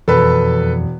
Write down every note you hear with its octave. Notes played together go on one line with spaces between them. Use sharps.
E1 F2 A4 B4